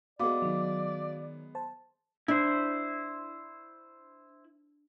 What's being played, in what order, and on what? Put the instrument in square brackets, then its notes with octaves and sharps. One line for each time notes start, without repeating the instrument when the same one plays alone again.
[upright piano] G#3 B3 [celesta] F#4 F5 D6 [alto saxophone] D5
[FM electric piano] D#3 F#3
C5 A5
[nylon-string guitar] D4 [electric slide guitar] E4 C5